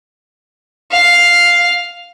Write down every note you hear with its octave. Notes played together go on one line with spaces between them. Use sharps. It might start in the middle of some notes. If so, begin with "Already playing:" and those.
F5